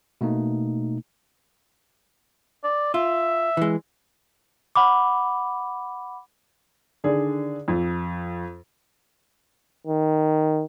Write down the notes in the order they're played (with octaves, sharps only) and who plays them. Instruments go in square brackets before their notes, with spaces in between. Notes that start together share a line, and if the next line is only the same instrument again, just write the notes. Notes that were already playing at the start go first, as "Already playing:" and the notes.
[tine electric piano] B2 A3 A#3 D#4
[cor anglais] D5
[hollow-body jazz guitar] F4 [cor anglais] E5
[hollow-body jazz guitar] E3 G#3
[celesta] F#5 B5 D6
[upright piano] D3 D#3 D4 G#4
F2
[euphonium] D#3